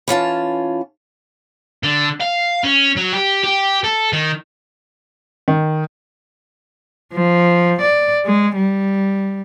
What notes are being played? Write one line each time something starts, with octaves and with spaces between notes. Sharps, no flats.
E3 C#4 F4 A5
D3
F5
C#4
F#3
G4
G4
A4
D#3
D#3
F3
D5
G#3
G3